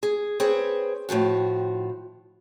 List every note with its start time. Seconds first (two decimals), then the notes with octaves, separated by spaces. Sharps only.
0.03 G#4
0.40 C4 G#4 B4 C#5
1.09 A2 D#3 F3 F#4